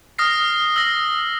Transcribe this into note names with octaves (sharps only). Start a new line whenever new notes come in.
D#6 F6 A#6 C7
E6 A#6